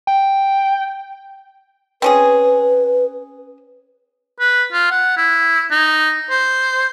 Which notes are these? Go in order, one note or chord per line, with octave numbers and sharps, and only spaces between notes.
G5
C4 C#4 G#4 B4
B4
F4
F#5
E4
D#4
C5